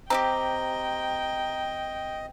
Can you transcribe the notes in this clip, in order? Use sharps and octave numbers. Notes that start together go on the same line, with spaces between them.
C4 E4 G4 D#5 G5 A#5